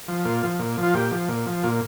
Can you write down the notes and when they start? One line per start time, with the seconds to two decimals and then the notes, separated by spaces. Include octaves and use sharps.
0.08 F3
0.25 A#2 F4
0.43 F3
0.59 A#2
0.78 F3
0.83 F4
0.94 A#2 G4
1.11 F3
1.29 A#2
1.46 F3
1.63 A#2 F4